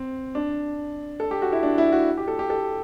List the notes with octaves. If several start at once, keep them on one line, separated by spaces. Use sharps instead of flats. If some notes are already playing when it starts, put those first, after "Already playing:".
Already playing: C4
D4
A4
G4
F#4
E4
D4
E4
F#4
G4
A4
G4
A4